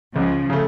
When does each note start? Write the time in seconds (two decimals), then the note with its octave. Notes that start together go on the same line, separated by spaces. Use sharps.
0.15 C#2 C#3 F3
0.50 C#3 A3